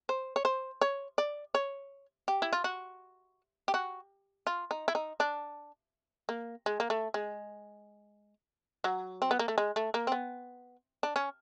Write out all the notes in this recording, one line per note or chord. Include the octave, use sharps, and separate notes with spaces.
C5
C#5
C5
C#5
D5
C#5
G4
E4
F4
F#4
G4
F#4
F4
D#4
E4
D#4
D4
A#3
G#3
A#3
A3
G#3
F#3
C4
B3
A#3
A3
G#3
A3
A#3
C4
B3
D4
C#4